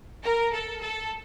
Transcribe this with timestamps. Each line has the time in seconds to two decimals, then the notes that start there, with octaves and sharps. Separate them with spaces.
0.23 A#4
0.52 A4
0.81 A4